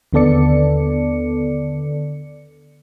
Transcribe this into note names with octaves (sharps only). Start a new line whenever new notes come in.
D#2 D3 B3 A4 D5 C#7